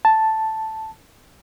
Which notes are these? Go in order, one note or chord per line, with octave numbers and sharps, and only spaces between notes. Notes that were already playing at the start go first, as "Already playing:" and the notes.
A5